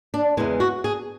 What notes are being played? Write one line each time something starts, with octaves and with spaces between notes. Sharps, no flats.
D4
E2 C#3 E3 G#3 E4
F#4
G#4